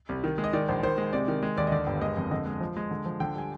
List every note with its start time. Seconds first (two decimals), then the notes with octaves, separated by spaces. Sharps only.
0.09 C2
0.24 D#3
0.38 G#3
0.44 D#5
0.53 D#3 D5
0.68 A#1 C5
0.83 D#3 C5
0.98 G#3
1.13 C3 D5
1.28 D#3
1.43 G#3
1.57 D#2 D5
1.67 D#5
1.72 D3 D5
1.87 G1
2.01 G#3 D#5
2.17 F2
2.31 D3 D#5
2.46 G#3
2.60 F3
2.77 G#3
2.91 D3
3.06 F3
3.20 D3 G5
3.35 G3 G#5